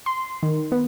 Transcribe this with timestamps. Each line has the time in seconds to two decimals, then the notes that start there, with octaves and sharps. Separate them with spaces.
0.06 C6
0.43 D#3
0.72 B3